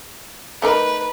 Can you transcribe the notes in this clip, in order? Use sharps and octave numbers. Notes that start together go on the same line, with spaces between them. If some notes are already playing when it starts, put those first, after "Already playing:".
A3 D#4 A#4 B4